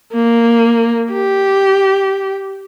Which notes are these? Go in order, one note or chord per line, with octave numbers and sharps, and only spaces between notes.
A#3
G4